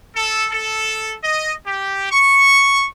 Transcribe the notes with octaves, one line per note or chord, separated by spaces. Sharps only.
A4
A4
D#5
G4
C#6